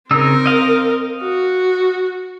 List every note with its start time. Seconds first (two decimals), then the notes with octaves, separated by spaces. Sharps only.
0.11 C#3 C4 D#4 A#4 E6
0.46 D#5 F5
1.21 F#4